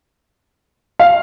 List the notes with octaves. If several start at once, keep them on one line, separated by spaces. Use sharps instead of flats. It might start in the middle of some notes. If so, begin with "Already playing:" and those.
F5